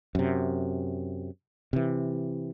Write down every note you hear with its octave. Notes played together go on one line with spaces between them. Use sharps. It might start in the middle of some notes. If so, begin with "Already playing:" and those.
F#2 C3
C3 E3